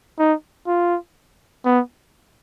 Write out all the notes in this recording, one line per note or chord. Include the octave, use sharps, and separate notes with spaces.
D#4
F4
B3